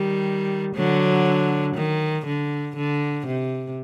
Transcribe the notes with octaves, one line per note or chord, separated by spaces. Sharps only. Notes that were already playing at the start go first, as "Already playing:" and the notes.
Already playing: D#3 G3
D3 F#3
D#3
D3
D3
C3